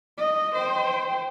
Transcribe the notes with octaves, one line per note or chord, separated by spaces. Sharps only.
D#5
C5 G5